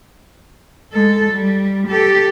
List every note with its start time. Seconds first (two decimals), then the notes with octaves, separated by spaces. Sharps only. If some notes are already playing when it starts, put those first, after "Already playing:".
0.93 G#3 A4
1.32 G3
1.88 G4 A4